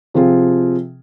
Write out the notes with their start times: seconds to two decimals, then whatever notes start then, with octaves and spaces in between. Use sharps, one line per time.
0.14 C3 F3 C4 F4 G#4